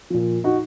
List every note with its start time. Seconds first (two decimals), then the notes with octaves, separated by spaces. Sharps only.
0.10 A#2 F3
0.44 D#4 F#4